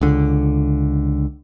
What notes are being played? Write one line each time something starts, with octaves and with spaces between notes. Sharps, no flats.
C#2 D3